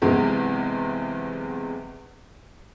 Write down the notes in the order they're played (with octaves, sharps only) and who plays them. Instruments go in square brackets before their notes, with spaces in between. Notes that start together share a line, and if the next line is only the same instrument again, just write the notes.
[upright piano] B1 E2 C3 G#3